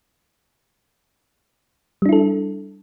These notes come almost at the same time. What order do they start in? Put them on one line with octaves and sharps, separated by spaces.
G3 D4 E4 A4